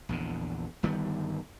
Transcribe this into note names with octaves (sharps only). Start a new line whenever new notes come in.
A#1 E2 D3
G1 D#3 G3 B3